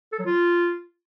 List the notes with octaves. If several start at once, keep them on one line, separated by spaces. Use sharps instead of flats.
A4
F#3
F4